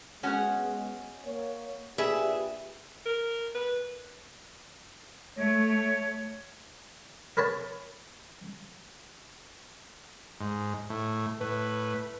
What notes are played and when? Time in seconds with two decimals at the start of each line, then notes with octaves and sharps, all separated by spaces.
0.23 G#3 B3 C#4 F#4 D#5 F#5
1.24 A#3 C#5
1.98 A#2 D4 G4 G#4 B4 E5
3.06 A#4
3.55 B4
5.37 A3 C#5
7.37 A#4 B4 C#5 A5
10.40 G#2
10.90 A2
11.41 A2 B4